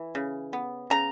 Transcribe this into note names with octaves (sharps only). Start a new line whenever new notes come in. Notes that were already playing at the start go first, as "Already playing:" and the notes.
Already playing: E3
C#3
B3
C#3 A#5